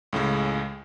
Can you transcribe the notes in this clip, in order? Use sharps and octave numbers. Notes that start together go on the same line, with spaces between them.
C#2 A2 C#3 G#3